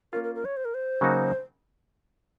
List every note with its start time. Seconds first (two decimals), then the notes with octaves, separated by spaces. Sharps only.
0.13 A#3 C#4 F4 A#4
0.24 A#4
0.35 A#4
0.45 C#5
0.57 C5
0.65 A#4
0.74 C5
1.01 C#3 F#3 A#3 D#4 F#4